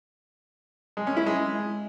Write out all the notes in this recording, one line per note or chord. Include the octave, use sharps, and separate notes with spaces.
G#3
C#4
E4
G#3